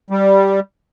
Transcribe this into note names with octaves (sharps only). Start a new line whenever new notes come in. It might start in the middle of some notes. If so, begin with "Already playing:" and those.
G3